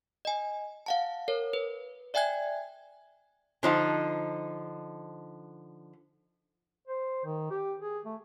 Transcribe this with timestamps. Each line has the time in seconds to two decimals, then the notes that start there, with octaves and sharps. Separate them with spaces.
0.25 D#5 G#5
0.86 F5 F#5 A5
1.28 A#4 C#5
1.53 B4
2.14 D5 E5 G5 G#5 F#6 G#6
3.63 D3 F3 D#4
6.88 C5
7.25 D#3
7.51 G4
7.81 G#4
8.06 A3